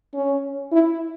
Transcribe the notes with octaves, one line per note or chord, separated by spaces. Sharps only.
C#4
E4